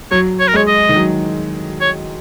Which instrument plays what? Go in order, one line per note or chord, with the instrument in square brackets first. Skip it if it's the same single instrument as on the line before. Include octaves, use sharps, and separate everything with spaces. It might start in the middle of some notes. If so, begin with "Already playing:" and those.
[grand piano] F#3 [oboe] C#5
[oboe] C#5
A#4
[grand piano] G#3 [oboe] C#5
[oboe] D#5
[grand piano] D#3
F#3
[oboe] C#5